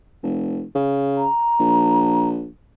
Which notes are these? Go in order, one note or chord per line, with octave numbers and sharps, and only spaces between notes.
F1
C#3
A#5
A#1